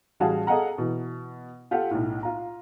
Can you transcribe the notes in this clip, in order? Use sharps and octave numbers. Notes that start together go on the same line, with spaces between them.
A1 G3 F#4 G#4 F5 A5
G#4 A4 D#5 F5 F#5 A#5
B2 E3
F4 G4 A4 F#5
B1 A2
F4 A#5